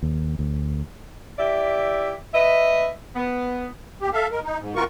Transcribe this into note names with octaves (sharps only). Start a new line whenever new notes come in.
D#2
D2
E4 G4 D5 E5
B4 D#5 E5
B3
D#2 G4
A4 E5 F5
G#3 A#4
D#4
G#2
C3 E3 F4 F#4 A#4 C#6